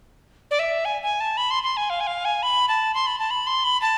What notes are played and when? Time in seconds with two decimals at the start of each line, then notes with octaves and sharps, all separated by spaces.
0.51 D5
0.59 E5
0.85 G#5
1.03 G#5
1.20 A5
1.37 B5
1.51 C6
1.63 C6
1.77 G#5
1.90 F5
2.00 G#5
2.07 F5
2.25 G#5
2.43 B5
2.68 A5
2.95 C6
3.07 B5
3.19 A5
3.31 B5
3.47 C6
3.64 B5
3.82 A5